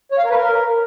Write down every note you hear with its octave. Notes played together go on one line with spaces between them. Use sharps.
C#5
F5
A#4
B4
A#4